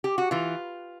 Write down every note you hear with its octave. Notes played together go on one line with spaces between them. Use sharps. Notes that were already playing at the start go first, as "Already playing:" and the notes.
G4
F#4
E3 F4